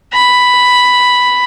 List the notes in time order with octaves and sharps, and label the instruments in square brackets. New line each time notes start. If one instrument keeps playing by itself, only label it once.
[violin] B5